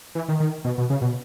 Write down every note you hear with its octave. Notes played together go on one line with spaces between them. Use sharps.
E3
D#3
D#3
B2
B2
C#3
B2